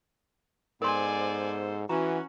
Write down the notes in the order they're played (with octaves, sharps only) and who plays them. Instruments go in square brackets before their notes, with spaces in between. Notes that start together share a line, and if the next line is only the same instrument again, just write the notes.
[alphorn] G#2 [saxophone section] B3 A4 C5 [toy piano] A#4 C6 [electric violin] D5 G#5
[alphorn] E3 [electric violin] C#4 [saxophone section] F#4 [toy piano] A#5